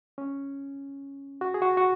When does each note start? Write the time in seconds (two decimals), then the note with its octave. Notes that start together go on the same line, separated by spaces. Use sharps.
0.18 C#4
1.41 F#4
1.54 G#4
1.62 F#4
1.77 F#4